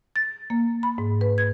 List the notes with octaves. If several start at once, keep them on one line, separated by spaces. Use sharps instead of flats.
A6
A#3
B5
G#2
B4
G#6